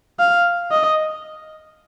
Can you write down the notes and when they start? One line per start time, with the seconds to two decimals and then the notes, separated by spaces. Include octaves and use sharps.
0.20 F5
0.71 D#5